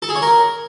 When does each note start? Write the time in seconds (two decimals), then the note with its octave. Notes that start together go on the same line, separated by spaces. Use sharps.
0.02 A4
0.09 G#4
0.15 C#5
0.22 A#4